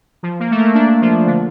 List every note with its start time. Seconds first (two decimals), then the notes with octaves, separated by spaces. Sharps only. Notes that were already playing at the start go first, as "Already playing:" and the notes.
0.23 F3
0.40 A#3
0.51 A3
0.58 A#3
0.74 D4
1.01 F3
1.27 D3